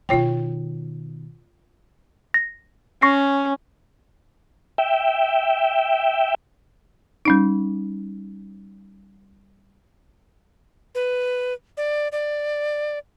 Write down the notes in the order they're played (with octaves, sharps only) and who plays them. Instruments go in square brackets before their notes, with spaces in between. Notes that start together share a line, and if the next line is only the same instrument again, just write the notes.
[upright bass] B2 D#3 [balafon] F4 C#5 G5
[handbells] A#6
[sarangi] C#4 [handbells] C#6 A#6 C7
[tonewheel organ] E5 G5
[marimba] G3 C#4 D#4
[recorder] B4
D5
D5